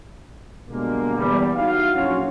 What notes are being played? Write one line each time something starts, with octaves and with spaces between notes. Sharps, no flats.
B2 D3 G3 G#3 A#3
E2 G3
D#4 E4 F#4 F5
A#1 F#3 C#4 F4 F#4 C#5